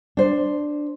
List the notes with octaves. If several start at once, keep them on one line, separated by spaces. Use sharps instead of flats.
D4 C5